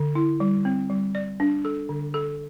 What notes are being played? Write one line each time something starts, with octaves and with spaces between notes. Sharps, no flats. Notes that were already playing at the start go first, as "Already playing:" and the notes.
Already playing: D3
E4
G3
C4
G3
D5
D4
A4
D3
A4